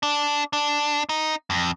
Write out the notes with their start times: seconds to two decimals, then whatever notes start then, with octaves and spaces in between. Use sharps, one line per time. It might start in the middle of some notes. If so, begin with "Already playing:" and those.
0.03 D4
0.53 D4
1.09 D#4
1.50 F2